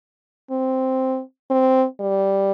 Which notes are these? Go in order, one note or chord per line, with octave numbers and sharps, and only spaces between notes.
C4
C4
G3